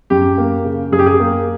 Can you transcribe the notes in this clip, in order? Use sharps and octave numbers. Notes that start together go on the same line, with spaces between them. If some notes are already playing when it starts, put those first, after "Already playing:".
F#2 G4
A#3
C#3
F#2 G#4
G4
G#4
A#3